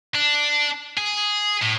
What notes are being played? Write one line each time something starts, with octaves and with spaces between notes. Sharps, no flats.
D4
G#4
A2